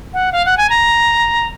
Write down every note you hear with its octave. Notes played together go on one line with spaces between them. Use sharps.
F#5
F5
F#5
G#5
A#5